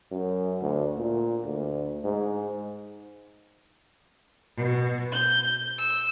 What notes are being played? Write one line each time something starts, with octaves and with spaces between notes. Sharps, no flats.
F#2
D2
A#2
D2
G#2
B2
G6
E6